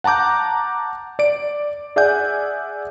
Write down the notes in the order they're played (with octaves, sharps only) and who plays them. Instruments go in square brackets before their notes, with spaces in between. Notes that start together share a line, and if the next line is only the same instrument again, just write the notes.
[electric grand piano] F#5 A5 A#5 D6 G6
D5 D7
G#4 D5 E5 F#5 G#5 G6